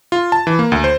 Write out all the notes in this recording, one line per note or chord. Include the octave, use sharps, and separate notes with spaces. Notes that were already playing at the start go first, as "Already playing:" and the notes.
F4
A5
E3
A#3
D2
C5